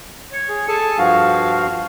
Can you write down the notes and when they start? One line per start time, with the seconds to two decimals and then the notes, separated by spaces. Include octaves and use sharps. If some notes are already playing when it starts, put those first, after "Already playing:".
0.33 C#5
0.49 G#4
0.68 G#4 A4 G#5 A5
0.99 G2 F3 F#4 F5